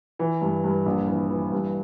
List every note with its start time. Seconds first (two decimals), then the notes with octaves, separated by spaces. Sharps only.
0.19 E3
0.41 G2
0.64 G2
0.86 A#1
1.08 E3
1.30 E3
1.52 G2